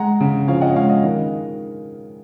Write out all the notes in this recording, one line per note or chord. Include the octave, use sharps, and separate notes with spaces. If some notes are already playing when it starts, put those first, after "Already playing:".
Already playing: G#3 F#5 A#5
C#3
F3 C#5 F5
D#5 F#5
G#3 C#5 F5
D#5
D#3